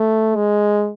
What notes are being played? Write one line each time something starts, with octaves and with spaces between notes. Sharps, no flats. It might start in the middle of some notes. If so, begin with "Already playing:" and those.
Already playing: A3
G#3